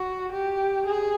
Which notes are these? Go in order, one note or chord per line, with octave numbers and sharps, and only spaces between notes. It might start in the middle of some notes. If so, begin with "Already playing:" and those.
Already playing: F#4
G4
G#4